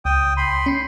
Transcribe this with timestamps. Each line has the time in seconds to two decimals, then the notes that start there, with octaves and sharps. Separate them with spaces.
0.05 C#2 G5 D#6
0.37 B5 C6
0.66 C#4 C7